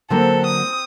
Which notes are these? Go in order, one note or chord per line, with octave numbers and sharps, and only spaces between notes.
D3 F#3 A#3 C4 A4
D#6